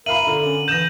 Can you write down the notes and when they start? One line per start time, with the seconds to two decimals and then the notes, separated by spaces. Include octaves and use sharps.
0.06 A#4 E5 F5 B5 D#7 F#7
0.27 D3
0.45 C#4
0.68 E3 G6 A#6 E7